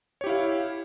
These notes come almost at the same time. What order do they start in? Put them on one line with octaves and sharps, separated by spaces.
C#5 G4 E4 F5